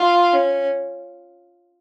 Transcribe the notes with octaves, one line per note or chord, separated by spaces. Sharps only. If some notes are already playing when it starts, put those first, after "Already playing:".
Already playing: F4
C#4